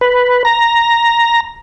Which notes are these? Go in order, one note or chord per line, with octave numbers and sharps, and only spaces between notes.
B4
A#5